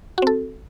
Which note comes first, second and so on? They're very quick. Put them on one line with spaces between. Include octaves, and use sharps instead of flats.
F#4 C4 A4